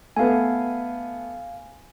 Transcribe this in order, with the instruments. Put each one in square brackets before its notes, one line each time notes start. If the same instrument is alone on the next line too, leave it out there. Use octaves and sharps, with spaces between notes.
[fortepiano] A3 B3 [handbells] F5 G#5